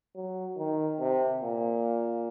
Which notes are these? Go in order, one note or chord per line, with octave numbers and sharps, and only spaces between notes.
F#3
D#3
C3
A#2